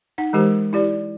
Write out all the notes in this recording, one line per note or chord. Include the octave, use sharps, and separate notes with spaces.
D#4 F#5
E3 G#3 G4 A#4 C5
E4 G4 D5